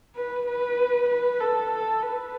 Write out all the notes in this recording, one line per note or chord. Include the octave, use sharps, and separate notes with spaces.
B4
B4
B4
A4
A4
B4